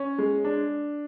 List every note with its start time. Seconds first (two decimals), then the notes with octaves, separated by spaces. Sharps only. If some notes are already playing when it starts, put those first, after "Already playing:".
Already playing: C#4
0.18 G#3
0.44 D4